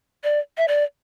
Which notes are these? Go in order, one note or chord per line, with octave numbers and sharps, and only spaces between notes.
D5
E5
D5